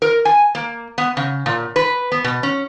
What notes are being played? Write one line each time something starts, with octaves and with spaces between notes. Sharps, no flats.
A#4
G#5
A#3
B3
C#3
A#2
B4
B3
B2
C#4